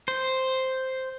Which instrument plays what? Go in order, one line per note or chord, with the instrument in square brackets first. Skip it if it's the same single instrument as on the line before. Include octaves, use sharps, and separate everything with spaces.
[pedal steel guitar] C5